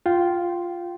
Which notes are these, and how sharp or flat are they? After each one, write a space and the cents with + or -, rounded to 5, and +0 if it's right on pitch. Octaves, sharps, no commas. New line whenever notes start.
F4 +0 G5 -20 C6 +0